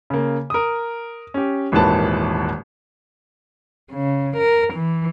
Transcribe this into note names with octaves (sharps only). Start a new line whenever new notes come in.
C#3 A#3
A#4 D#6
C#4 G4
D#1 G#1 D#3 E3 B4 A5
C#3
A#4
E3